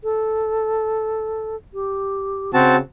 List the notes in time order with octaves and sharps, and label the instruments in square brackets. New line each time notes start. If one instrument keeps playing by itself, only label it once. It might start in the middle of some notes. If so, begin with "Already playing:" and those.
[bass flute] A4
G4
[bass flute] C#3 [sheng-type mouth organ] C4 F#4 A5